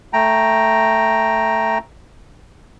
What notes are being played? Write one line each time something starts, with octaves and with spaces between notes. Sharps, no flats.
A3 G5 A#5